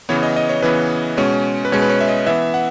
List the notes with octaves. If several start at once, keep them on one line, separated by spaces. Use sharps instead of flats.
C#3 E3 B3 C#5
D#5
D#5
C#5
C#3 E3 B3 B4
B2 G#3 C#4 C#5
B4
B2 G#3 C#4 C#5
B4
C#5
E5
D#5
E3 B3 E5
F#5